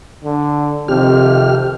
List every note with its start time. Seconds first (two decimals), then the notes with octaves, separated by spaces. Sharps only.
0.24 D3
0.88 F2 C3 D#3 G4 F6